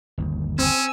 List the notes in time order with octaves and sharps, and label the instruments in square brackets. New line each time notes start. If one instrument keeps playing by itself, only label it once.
[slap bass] G1 D#2
[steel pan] C4 [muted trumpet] C#4 [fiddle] G#5 E6